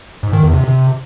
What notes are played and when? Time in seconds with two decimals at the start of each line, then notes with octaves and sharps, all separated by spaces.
0.23 G#2
0.33 D#3
0.43 E2
0.53 C3
0.64 C3